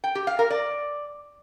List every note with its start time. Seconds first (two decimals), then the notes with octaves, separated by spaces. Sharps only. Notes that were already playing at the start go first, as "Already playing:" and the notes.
0.04 G5
0.15 G4
0.27 F5
0.39 A#4
0.50 D5